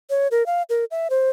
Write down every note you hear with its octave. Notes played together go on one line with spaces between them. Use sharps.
C#5
A#4
F5
A#4
E5
C5